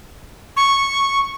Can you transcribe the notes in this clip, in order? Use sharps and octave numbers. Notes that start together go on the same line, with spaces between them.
C#6